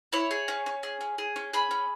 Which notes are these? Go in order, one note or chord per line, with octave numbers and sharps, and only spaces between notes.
E4 C#5
G#4
C#4
C#4
G#4
C#4
G#4
C#4
G#4 B5
C#4